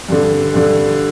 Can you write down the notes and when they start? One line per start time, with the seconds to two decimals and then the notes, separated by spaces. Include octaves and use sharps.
0.08 G2 D3
0.54 G2 D3